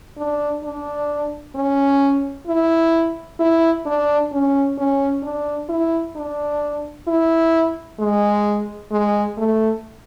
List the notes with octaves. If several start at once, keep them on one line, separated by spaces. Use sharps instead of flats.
D4
D4
C#4
E4
E4
D4
C#4
C#4
D4
E4
D4
E4
G#3
G#3
A3